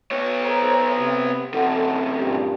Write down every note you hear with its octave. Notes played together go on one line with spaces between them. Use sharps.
B3 C#5
A4 C5 A#5
C3
F#2 C3 A4 F#5
G2 A#2 G4